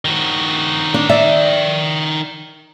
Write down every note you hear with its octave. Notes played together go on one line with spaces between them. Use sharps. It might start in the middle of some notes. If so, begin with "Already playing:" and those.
D#3 F#4
D4
D5 E5